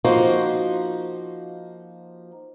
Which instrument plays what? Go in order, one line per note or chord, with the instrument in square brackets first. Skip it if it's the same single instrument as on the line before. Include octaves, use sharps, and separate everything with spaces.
[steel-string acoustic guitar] F3 A#3 D#4 F#4 C5